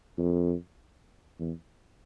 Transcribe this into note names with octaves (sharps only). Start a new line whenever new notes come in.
F2
E2